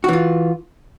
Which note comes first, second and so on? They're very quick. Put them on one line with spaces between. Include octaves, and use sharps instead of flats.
F#4 E3 F4